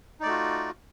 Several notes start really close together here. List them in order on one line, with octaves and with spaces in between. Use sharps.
D#4 D5 A3 F#4 F4